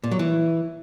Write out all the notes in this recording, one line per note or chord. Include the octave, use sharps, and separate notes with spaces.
A#2
F#3
E3